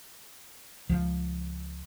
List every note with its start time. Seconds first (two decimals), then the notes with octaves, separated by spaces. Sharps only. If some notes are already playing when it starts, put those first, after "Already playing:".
0.89 C#2 F3